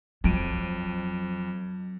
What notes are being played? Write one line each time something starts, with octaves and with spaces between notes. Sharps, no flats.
F2 F#3 D7 D#7